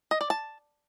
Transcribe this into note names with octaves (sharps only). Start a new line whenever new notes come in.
D#5
D5
A5